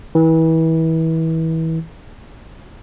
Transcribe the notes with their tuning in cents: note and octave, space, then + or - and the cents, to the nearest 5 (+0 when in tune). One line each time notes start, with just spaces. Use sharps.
E3 -30